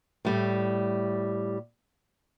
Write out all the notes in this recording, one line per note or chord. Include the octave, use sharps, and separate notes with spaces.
A2 G3 A3